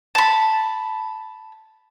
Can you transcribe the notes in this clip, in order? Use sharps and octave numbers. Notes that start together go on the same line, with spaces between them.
A5 B5